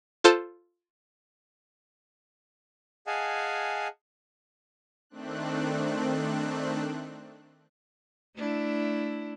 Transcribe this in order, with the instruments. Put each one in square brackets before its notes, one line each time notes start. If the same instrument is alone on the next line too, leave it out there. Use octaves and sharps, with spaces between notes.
[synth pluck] F4 A4 C5 A5 A6
[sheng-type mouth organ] G#4 D#5 F5 F#5 G#5 A5
[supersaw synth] D#3 A3 C4 D4 F#6
[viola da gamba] A3 D4 E4